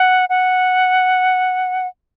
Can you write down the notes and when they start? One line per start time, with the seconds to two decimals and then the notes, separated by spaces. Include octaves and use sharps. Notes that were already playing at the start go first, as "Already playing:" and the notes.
Already playing: F#5
0.29 F#5